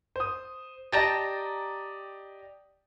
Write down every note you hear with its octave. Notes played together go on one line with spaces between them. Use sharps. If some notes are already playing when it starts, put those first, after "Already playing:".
C5 D#6
G4 D5 D#5 G5 A5 A#5